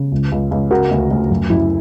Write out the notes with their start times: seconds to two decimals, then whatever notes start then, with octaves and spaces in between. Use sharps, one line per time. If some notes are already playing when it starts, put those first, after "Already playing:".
Already playing: C#3
0.12 C#2
0.32 C#2
0.51 C#2
0.71 C#3 F#4 A#4
0.91 D2
1.11 D2
1.30 F#2
1.50 F#2 E4